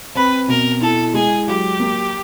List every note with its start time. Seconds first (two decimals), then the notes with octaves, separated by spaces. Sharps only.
0.16 C4 B4
0.48 B2 A#4
0.81 E4 A4
1.14 G#3 G#4
1.47 F#3 G4
1.79 A#3